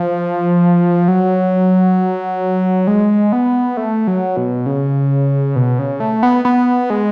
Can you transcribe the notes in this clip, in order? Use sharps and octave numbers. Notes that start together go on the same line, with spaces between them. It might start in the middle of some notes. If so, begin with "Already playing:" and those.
Already playing: F3
F#3
G#3
B3
A3
F#3
B2
C#3
B2
C#3
A3
B3
B3
G#3